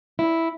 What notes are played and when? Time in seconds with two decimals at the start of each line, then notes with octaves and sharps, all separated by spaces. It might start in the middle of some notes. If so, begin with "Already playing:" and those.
0.19 E4